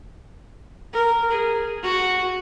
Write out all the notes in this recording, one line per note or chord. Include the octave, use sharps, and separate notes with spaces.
A#4
G#4
F#4